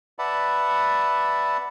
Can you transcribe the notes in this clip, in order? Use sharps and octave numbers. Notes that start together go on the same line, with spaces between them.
B4 D5 E5 F#5 A5 B5